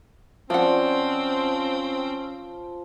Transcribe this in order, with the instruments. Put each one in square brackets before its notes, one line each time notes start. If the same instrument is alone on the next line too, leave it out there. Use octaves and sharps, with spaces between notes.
[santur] F3 [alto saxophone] C4 [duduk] C#4 [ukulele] D5 F#5